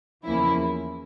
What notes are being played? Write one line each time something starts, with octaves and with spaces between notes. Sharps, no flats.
E2 C#3 F3 A#3 C#4 E4